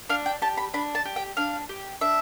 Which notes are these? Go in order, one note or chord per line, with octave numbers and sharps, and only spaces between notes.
D4 F5
G5
G4 A5
B5
D4 B5
A5
G4
G5
D4 F5
G4
D4 E5